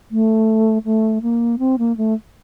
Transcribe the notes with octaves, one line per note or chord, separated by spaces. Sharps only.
A3
A3
A#3
C4
A#3
A3